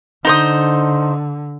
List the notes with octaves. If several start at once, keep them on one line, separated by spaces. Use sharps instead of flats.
D3 D#4 C5 D#6